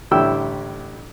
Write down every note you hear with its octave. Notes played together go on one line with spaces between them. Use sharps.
A1 D3 G3 E4 G5 E6